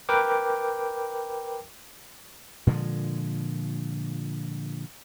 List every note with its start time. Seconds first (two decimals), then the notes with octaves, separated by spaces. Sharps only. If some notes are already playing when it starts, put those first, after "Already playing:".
0.09 A#4 B4 G5 D6
2.67 A#2 D3 F3 G#3